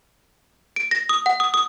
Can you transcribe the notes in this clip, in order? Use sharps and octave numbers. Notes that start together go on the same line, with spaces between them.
D7
A#6
D#6
F#5
D#6
D#6